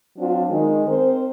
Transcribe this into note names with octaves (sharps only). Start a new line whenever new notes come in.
F#3 C4 D4 F4
D#3 G#3
C4 A#4 C5